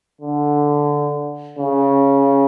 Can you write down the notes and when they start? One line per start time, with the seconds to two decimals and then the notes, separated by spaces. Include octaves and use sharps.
0.21 D3
1.59 C#3